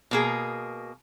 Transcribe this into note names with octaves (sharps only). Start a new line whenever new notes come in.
B2 A#3 G#4